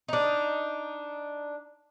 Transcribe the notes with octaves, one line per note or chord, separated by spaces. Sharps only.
D4 D#4